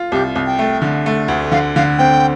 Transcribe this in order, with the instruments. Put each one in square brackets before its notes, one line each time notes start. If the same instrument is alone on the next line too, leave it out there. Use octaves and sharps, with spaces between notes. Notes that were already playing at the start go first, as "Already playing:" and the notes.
Already playing: [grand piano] F4
[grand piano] C2 [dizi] G4
[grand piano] C2
[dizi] G5
[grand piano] A3
D3
A3
D2
[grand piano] D3 [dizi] F5
[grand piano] D3 [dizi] F5
[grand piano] C4 [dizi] G5